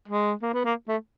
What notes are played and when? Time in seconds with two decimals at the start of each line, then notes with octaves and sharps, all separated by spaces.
0.08 G#3
0.42 A#3
0.54 B3
0.65 A#3
0.88 A3